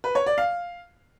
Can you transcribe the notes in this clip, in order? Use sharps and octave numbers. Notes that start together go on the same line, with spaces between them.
B4
C#5
D5
F5